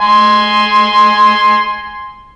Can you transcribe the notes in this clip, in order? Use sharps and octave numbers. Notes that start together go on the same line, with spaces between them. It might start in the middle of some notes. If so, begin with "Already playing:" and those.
G#5 C6